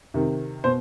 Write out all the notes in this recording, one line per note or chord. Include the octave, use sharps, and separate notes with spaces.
C3 D#3
B2 C5